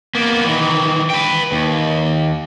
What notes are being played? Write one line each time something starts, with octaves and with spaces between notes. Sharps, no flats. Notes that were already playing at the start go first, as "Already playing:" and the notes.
A#3 B3
D#3 E3
B4 G5
D#2